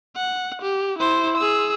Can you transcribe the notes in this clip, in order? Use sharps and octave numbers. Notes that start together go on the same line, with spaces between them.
F#5
G4
E4 C5
G#4 E6